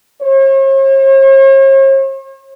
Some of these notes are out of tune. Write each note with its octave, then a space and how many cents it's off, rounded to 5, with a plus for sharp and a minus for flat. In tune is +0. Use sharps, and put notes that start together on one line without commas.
C#5 -45